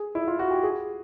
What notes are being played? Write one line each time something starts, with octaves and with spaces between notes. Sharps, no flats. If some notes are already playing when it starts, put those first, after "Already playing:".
Already playing: G#4
E4
F4
F#4
G4
G#4